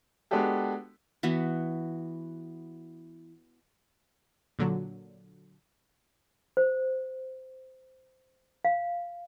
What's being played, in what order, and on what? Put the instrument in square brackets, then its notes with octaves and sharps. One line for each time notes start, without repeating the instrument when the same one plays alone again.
[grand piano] G#3 B3 D4 F#4 G4 A4
[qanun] E3 B3 F#4
[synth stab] A#2 D3 F#3
[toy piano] C5
F5